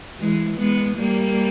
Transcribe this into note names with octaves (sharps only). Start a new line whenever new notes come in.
E3 G#3
G#3 B3
G3 A#3